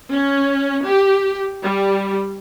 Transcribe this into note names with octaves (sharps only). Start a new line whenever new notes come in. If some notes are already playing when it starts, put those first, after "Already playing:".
C#4
G4
G3